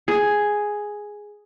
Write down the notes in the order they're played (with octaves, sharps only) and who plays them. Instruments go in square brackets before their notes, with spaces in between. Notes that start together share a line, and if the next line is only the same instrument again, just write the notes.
[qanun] G#4